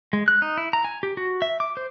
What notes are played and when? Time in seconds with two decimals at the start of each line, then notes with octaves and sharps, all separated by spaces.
0.13 G#3
0.28 F#6
0.42 D#4
0.57 E4
0.73 A#5
0.85 G#5
1.03 G4
1.17 F#4
1.42 E5
1.60 D6
1.77 C5